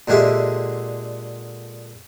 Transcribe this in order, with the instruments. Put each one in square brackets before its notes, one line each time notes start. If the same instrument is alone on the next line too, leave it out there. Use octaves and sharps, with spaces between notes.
[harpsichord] A#2 D3 G#3 G4 E5